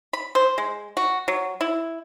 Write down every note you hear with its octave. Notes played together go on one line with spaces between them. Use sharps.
B5
C5
G#3
F#4
F#3
E4